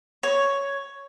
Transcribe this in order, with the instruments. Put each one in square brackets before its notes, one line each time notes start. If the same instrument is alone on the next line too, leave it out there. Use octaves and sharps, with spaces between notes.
[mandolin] C#5